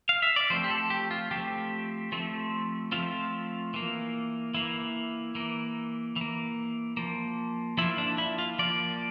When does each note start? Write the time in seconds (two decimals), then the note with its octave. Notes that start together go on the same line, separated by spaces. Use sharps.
0.09 F5
0.22 E5
0.36 D5
0.50 F3 A3 C4 C5
0.64 G4
0.70 A4
0.90 G4
1.11 F4
1.31 F3 A3 C4 G4
2.12 F3 A3 C4
2.92 F3 A3 C4 F4
3.74 E3 A#3
4.54 E3 A#3 E4
5.35 E3 A#3
6.16 E3 A#3
6.97 F3 A#3
7.78 F3 A#3 E4
7.98 D4
8.18 E4
8.39 F4
8.59 F3 A#3 D5